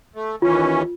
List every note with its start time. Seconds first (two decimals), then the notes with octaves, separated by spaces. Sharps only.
0.15 A3
0.42 D#2 E3 C#4 F4